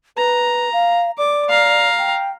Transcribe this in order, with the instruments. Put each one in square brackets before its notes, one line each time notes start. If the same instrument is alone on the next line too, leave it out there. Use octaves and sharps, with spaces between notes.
[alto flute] B4 [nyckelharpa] A#5
[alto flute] F5
[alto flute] D5 [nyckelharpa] D6
[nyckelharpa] F5 A#5
[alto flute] G5